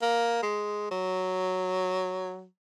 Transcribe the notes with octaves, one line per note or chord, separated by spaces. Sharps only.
A#3
G#3
F#3